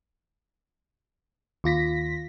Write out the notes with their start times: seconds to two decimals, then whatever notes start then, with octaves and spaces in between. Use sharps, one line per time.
1.64 D#2 F4 A#6 B6